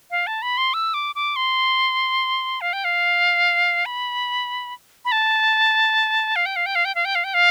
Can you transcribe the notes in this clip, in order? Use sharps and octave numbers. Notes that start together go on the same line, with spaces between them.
F5
A5
B5
C6
E6
D6
D6
C6
F5
G5
F5
B5
B5
A5
F5
G5
F5
G5
F5
G5
F5
G5
F5
G5
F5